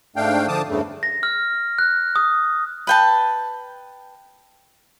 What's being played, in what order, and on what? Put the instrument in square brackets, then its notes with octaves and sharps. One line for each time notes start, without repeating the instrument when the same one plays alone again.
[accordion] G#2 A3 D4 F5 G5
D3 F3 A5 D6 D#6
E2 G2 C#3 A3
[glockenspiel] A#6
F6
F#6
D#6
[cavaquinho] B4 G5 A5